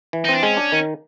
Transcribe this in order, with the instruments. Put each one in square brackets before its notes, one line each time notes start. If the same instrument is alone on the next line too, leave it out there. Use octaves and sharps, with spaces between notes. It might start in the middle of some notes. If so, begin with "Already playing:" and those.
[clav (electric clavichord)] E3
[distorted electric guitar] D#4
[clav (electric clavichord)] C4
[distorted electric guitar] D4
[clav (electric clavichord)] G#3 [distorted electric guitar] C#4
[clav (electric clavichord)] D4
D#3